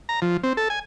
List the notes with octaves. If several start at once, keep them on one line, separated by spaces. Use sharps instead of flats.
A#5
F3
C4
A4
G#5